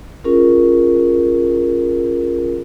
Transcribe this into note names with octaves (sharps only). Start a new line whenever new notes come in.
C#4 F4 G#4 A#4